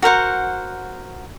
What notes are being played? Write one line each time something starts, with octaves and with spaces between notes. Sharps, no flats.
F#4 A#4 C5 F#5